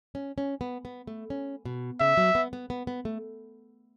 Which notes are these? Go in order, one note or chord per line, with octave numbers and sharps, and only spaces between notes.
C#4
C#4
B3
B3
A3
C#4
B2
C#3 E5
F#3
B3
B3
B3
B3
A3